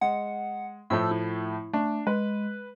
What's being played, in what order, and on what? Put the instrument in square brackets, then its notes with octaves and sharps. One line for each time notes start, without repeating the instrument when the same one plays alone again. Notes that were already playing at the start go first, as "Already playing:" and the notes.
[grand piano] G#3 [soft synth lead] F#5
[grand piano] A2 F3 A3 [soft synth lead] E6
[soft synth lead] E4
[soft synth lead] A3 [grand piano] D4
[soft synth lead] G#3 [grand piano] B4